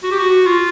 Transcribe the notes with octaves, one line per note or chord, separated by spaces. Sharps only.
F#4
G4
F#4
F4